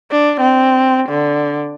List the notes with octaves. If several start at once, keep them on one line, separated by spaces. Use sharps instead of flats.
D4
C4
D3